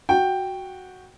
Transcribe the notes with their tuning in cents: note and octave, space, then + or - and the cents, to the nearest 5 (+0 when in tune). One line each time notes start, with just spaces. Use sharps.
F#4 +0 G5 +0